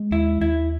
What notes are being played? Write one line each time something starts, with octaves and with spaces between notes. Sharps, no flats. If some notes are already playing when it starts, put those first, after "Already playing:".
Already playing: G#3
D#2 E4
D#2 E4